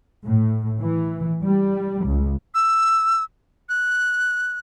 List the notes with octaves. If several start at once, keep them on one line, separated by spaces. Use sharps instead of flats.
A2
E3
G3
C#2
E6
F#6